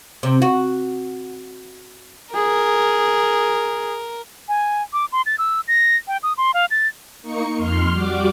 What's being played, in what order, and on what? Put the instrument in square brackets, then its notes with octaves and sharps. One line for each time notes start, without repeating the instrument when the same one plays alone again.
[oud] C3
F#4
[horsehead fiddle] G#4 [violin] A#4
[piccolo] G#5
D6
C6
A6
E6
A#6
G5
D#6
C6
F5
A6
[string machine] A#3 D#4 C#6 C#7
F2 C6 F6
G3 F#4 D6